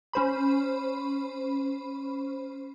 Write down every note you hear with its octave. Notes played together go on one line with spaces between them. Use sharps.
C#4 C5 B5